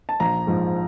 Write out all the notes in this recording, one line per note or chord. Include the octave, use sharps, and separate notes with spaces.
A5
A#1 A#5
G#2 F3